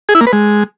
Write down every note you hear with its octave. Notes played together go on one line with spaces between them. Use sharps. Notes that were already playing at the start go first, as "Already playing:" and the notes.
G#4
E4
A#3
B4
G#3